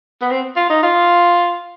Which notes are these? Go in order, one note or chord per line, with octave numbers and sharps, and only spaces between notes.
B3
C4
F4
D#4
F4